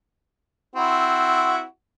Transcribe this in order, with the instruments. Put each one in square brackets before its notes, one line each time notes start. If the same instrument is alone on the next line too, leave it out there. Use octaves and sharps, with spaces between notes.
[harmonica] C4 E4 F#4